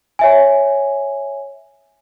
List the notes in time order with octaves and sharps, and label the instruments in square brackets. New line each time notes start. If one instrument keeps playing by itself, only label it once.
[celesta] C#5 E5 G#5